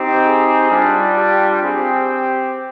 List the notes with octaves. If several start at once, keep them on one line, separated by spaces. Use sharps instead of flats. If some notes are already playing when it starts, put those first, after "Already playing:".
Already playing: C4 D#4 G4
G#4
G3 D4 F4
G4
C4 G4 G#4